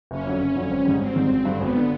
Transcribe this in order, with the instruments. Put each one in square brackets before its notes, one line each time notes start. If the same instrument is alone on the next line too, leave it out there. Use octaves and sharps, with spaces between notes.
[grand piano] F#1 [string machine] C#4
[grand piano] F2 D3 F#3
F#1
F2 D3 F#3
G#1
G#2 D#3 G3
[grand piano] G#1 [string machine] C4
[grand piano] G#2 D#3 G3
G#1
G2 D3
[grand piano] G#1 [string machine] B3
[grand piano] D3